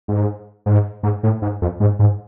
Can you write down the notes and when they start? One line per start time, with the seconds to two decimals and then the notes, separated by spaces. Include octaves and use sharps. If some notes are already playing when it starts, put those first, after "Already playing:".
0.08 G#2
0.66 G#2
1.03 G#2
1.23 A2
1.42 G#2
1.62 F2
1.80 G#2
1.99 G#2